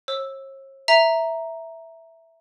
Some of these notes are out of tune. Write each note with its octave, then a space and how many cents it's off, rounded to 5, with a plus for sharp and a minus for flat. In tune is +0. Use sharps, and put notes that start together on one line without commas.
C#5 -45 E6 +0
E5 +0 A#5 +0